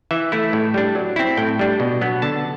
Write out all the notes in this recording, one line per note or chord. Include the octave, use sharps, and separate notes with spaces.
E3 E5
A3 E4
A2
G3 D4
F#3
C4 E4
A2 G5
G3 D4
B2
F#3 B3 D4
D3 A5